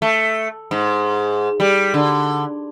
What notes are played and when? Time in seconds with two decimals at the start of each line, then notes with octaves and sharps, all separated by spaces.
0.02 A3
0.71 G#2
1.60 G3
1.94 D3